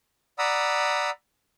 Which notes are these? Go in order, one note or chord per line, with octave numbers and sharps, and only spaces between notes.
D5 F#5 A#5 B5 D#6 E6